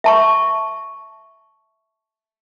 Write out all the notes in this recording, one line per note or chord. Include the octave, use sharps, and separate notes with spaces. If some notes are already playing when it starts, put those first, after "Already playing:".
E5 A5 C#6